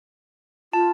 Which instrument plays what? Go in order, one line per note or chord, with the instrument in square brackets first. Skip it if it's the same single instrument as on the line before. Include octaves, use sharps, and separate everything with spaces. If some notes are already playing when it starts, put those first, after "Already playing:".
[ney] F4 [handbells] A5